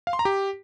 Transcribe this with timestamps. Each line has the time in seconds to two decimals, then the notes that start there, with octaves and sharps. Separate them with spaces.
0.07 F5
0.13 C6
0.19 A#5
0.25 G4